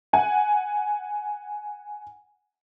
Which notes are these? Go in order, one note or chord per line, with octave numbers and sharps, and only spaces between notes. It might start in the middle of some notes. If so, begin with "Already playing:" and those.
F#5 G#5